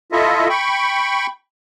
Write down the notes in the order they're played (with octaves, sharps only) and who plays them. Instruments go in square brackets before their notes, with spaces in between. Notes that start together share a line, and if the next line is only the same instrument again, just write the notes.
[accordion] E4 F4 A4 D#5 E5
G5 B5 C#6